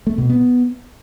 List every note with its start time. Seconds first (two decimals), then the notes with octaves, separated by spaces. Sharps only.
0.07 A3
0.18 B2
0.29 B3